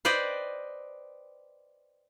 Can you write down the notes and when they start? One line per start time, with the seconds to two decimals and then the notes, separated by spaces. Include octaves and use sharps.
0.05 B4 C5 D5 D#5 G5